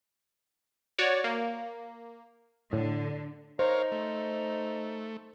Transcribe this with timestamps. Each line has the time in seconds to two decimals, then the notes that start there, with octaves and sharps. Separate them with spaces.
0.98 F#4 C#5 D5
1.24 A#3
2.73 A2 D3
3.59 D#4 A#4 C5 C#5 F5
3.92 A3